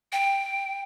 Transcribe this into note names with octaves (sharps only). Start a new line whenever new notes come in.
G5